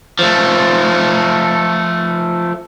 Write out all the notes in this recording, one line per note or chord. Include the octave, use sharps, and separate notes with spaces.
F3 A3